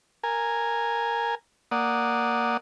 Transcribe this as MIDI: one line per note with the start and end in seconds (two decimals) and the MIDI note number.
0.23 1.35 70
0.23 1.35 80
1.71 2.57 58
1.71 2.57 74
1.71 2.57 78
1.71 2.57 87